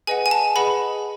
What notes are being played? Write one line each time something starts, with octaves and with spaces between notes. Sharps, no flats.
G#4 B4 D#5 F#5 G#5
G#5
A5
G#4 B4 D#5 F#5 B5